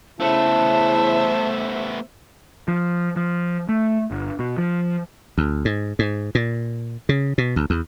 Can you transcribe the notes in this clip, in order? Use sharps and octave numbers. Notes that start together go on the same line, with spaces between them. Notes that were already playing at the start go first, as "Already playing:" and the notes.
C#3 A3 B3 E4 C5 E5 A5
F3
F3
A3
G1
B2
F3
D2
G#2
G#2
A#2
C#3
B2
D2
E2